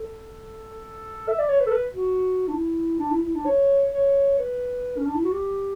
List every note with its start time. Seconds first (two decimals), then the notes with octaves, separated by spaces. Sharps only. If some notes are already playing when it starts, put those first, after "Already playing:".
Already playing: A4
1.28 E5
1.39 D5
1.49 C#5
1.60 B4
1.66 A4
1.71 B4
1.94 F#4
2.48 D4
2.54 E4
2.99 D4
3.11 E4
3.22 E4
3.35 D4
3.46 C#5
3.93 C#5
4.39 B4
4.98 C#4
5.06 D4
5.15 E4
5.24 F#4
5.32 G4